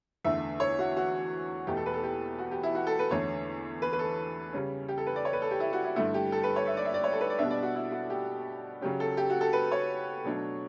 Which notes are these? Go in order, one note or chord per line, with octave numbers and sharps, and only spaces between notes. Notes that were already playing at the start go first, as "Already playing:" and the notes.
E2 D3 A3 E5
C#5
F#4
F#4
E2 B2 A3 G4
A4
B4
A4
G4
F#4
G4
E4
F#4
A4
B4
E2 D3 A3 C#5
B4
B4
A4
C#3 G3 C#4
G4
A4
B4
D5
C#5
B4
A4
G4
E4
F#4
E4
G2 D3 A3 E4
G4
A4
B4
C#5
E5
D5
E5
D5
C#5
A4
B4
D5
B2 G3 B3 D4 E5
D5
F#4
E4
F#4
G4
C#3 F#3 C#4 G4
A4
G4
F#4
A4
B4
C#5
B2 F#3 A3 D4